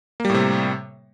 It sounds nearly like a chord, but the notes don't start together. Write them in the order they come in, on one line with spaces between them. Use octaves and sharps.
A#3 G3 A2 C3